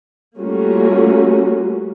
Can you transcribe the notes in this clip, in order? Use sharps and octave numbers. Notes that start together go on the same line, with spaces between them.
G3 A3 A#3 C#4 F4 F#4